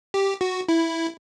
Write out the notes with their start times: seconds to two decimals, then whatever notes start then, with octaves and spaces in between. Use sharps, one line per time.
0.14 G4
0.41 F#4
0.68 E4